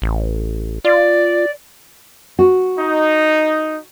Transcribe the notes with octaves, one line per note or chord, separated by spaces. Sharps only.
A1
F4 D5
F#4
D#4